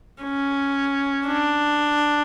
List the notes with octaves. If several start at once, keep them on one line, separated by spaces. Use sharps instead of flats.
C#4
D4